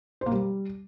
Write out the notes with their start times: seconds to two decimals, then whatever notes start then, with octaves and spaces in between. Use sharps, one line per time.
0.21 C5
0.26 A#3
0.31 G3